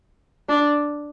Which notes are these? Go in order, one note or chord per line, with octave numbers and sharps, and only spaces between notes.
D4